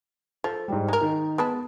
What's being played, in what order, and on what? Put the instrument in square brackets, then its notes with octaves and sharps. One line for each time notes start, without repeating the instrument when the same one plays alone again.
[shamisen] F3 [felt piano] A4
[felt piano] G#2 G3
[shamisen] G#3 A#4 [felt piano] A#5
[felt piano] D#3 D#4
[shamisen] G#3 B4 A5 [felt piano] B3